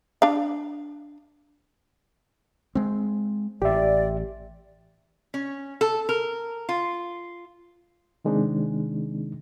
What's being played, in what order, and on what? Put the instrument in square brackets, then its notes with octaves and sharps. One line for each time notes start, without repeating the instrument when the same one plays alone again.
[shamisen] D4 F5
[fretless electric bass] G#3 C4
[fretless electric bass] A1 [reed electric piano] G4 E5 [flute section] D5
[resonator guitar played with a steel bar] C#4
A4
A#4
F4
[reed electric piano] C3 D#3 G#3 C4 D4 D#4